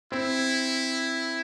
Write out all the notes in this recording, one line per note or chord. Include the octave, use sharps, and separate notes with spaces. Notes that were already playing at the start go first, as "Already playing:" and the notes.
C4 E4